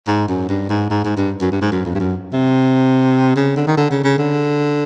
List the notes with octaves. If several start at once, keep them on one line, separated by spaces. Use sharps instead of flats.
G#2
F#2
G2
G#2
G#2
G#2
G2
F#2
G2
G#2
F#2
F2
G2
F#2
C3
C#3
D3
D#3
D3
C#3
C#3
D3